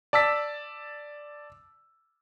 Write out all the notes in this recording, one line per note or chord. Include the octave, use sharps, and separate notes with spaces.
D5 A5 E6 B6